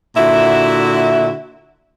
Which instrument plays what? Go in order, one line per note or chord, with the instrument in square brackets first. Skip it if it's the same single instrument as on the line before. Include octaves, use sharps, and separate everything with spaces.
[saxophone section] A#2 D3 E4 F#4 E5